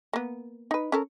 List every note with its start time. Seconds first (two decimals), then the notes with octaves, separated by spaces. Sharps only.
0.13 A#3 B3
0.71 D#4 B4
0.92 C#4 A4 A#4